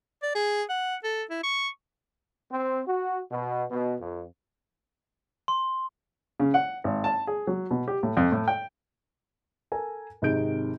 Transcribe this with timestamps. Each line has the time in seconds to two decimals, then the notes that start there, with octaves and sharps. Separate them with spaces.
0.23 D5
0.35 G#4
0.70 F#5
1.04 A4
1.30 E4
1.43 C#6
2.51 C4
2.87 F#4
3.32 B2
3.71 B2
4.00 F2
5.48 C6
6.40 C#3
6.54 F#5
6.84 G#1
7.04 A5
7.27 G#4
7.47 F#3
7.71 B2
7.88 G4
8.03 A2
8.17 F2
8.32 A2
8.48 G5
9.72 A4 A#4 G#5
10.22 G#1 C3 D#3 G#4 G6 D7